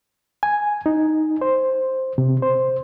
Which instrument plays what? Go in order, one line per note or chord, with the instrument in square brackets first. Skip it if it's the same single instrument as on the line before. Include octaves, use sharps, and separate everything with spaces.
[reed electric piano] G#5
D#4
C5
C3
C5